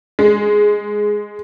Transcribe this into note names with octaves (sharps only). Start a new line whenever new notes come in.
G#3